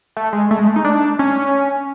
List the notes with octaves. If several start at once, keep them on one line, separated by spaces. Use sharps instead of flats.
A3
G#3
A3
G#3
A3
D#4
D4
C#4